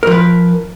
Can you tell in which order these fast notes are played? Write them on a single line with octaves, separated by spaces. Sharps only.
A#4 F3 B4